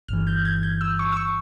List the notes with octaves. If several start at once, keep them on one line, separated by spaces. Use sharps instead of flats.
G1 G2 E3 F6
G6
G#6
G6
E6
C#6
E6
C#6